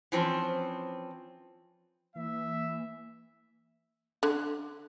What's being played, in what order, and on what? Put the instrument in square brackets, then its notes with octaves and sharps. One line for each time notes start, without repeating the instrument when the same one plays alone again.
[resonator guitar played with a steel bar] E3 F3 C4 C#4
[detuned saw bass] E3 [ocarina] A#3 [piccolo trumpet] E5
[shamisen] D3